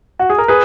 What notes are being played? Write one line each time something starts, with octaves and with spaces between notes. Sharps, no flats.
F#4
G#4
A#4
G#4 B4